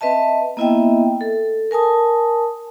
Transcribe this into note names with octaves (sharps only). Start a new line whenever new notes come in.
C4 B4 D#5 E5 A5
A#3 B3 E4 D#5 E5 G5
A4
A#4 G#5 A5 D#6